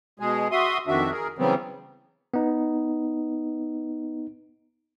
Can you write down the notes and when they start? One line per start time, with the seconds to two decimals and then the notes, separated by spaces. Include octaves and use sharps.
0.20 B2 G#3 G#4
0.51 F#4 E5 C6 D#6
0.87 F2 D#3 D4 F#4 E5
1.11 G#4 A#4
1.38 C#3 E3 F#3 G3 B3 C4
2.34 B3 D#4